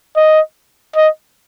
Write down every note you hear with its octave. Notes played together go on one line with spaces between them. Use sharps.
D#5
D#5